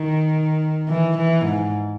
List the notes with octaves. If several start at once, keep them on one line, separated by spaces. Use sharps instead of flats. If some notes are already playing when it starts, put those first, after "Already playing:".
Already playing: D#3
E3
E3
G#2